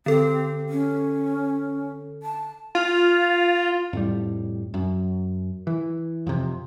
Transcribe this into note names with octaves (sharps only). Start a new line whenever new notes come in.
D3 C4 A4
C#4
A5
F4
F2 A2 G3
F#2
E3
F2 C3